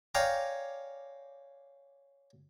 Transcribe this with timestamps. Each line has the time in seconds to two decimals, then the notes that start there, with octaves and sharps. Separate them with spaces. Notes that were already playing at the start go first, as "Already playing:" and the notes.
0.15 C#5 D5 F5 G5 G#5 A#5